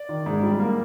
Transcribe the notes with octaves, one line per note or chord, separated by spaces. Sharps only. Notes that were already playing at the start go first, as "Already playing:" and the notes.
Already playing: D5
D#3
G#2
G3
A#3